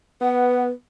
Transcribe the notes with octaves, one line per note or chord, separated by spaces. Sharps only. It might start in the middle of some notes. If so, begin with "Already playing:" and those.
B3 B4 F#5